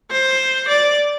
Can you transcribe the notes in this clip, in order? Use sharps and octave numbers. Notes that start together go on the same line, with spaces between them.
C5
D5